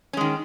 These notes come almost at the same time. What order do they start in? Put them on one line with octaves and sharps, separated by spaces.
C#4 G#3 D#3